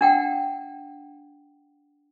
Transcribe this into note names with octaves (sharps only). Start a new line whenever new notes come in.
D4 F#5 G5